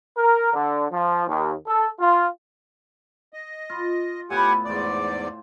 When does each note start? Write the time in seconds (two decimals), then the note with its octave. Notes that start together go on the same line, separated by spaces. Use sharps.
0.17 A#4
0.54 D3
0.92 F3
1.28 D#2
1.67 A4
2.00 F4
3.33 D#5
3.70 F4
4.30 A2 B3 G4 F#5 G#5 B5
4.65 E2 G#2 C5 D5 D6